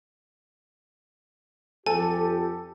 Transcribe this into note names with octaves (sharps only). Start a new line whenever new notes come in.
F2 G4 A4 G#5